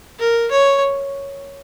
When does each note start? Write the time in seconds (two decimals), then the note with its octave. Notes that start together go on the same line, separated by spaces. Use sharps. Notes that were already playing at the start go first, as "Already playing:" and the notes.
0.19 A#4
0.52 C#5